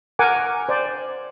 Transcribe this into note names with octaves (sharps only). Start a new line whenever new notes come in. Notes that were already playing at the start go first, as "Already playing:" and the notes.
A#4 F#5 G#5 D6
C5 D5